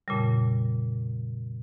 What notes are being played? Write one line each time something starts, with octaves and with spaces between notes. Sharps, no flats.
F2 A#2 C#3 G3